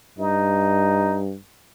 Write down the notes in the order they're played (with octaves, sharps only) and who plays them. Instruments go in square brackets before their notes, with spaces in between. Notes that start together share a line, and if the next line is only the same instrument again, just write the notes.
[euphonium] G2 [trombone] D#4